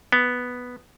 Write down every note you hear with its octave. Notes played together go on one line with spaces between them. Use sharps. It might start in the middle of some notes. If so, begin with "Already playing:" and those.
B3